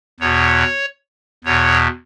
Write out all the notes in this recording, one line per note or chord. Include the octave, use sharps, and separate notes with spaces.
E2 B2 C#5
E2 B2 C#5